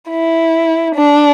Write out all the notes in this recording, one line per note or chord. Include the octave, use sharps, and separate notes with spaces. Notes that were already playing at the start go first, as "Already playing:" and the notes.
E4
D4